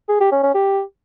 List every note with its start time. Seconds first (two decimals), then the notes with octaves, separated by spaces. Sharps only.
0.09 G#4
0.20 G4
0.32 C#4
0.43 C#4
0.54 G4